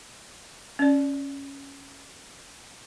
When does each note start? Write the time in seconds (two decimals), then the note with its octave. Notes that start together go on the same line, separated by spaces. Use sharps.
0.79 C#4 D5